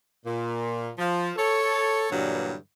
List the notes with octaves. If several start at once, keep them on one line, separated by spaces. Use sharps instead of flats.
A#2
F3
A4 C#5
G2 A#2 D3 E3 F#3 G3